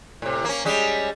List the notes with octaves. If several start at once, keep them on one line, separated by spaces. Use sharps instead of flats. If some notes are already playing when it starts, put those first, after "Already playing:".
A2 C3
A#3 C#4
G3 G#3 C#4